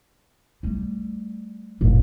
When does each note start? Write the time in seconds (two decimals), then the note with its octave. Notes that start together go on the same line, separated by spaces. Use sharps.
0.63 G3 A3
1.81 F1 A#1 A2